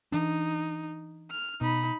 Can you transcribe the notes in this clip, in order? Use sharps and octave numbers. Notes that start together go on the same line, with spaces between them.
E3 D4 D#4
F6
B2 D#4 B5